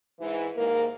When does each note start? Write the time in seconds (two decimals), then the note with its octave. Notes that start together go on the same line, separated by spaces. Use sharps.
0.19 G#2 E3
0.56 D#2 G#2 A#3 A#4